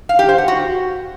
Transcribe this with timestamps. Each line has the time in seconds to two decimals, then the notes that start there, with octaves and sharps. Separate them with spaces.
0.09 F5
0.19 G4
0.29 C5
0.38 F#5
0.48 F#4